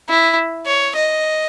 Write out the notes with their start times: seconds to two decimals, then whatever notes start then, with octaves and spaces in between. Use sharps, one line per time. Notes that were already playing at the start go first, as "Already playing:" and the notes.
0.09 E4
0.67 C#5
0.96 D#5